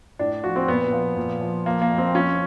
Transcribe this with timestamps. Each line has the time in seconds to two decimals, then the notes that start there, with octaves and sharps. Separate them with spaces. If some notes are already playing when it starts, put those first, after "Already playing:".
0.19 A2 D4
0.44 F3 F#4
0.56 C4
0.68 A#2 B3
0.92 F3
1.17 A#2
1.41 F3
1.66 F3 A#3
1.81 A#3
1.90 F2
1.98 C4
2.15 F3 C#4